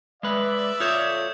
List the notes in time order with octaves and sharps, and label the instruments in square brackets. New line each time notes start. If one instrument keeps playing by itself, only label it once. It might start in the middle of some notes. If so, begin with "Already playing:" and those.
[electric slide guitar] G#3 B4 [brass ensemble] D5 E5
[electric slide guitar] F4 A4 C#5 [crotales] D#6 G6 E7